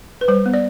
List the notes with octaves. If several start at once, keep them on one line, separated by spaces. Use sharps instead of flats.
B4
G3 C5
B3
D5